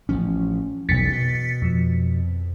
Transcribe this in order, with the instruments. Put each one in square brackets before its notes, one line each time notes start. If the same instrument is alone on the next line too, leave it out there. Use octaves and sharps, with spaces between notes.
[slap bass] A1 F3 C#4
[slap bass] E1 B1 E2 [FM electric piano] A6 B6 C#7
[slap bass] B2
[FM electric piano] F2 F3